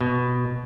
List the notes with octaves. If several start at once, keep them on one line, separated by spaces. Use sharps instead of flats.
B2